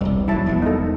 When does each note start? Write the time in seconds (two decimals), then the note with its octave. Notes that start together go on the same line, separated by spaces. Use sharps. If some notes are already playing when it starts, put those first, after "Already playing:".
0.01 E1 C2 G3
0.28 D#1 F#3 E4 A5
0.46 E1 C3 F3 B3
0.62 D#4 A4